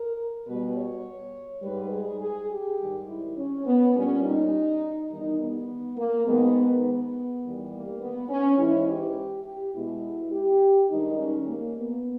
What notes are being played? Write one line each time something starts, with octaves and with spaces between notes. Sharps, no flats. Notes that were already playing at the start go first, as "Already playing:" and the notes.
Already playing: A#4
B2 G3 B4
C#5
G#2 G3 B4
G#4
G#4
G4
G#2 D#3 G3
E4
C#4
B3
A#2 G3 C#4
D#4
E2 D#3 G3 D#4
B3
A#3
G#2 D#3 G#3 B3
B3
E2 D#3 G3
A#3
B3
C#4
G#2 E3 G#3 E4
G4
G4
B2 G#3 E4
G4
G2 D#3 G#3 D#4
C#4
A#3
B3